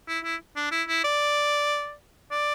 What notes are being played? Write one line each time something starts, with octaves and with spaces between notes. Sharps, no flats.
E4
E4
D4
E4
E4
D5
D5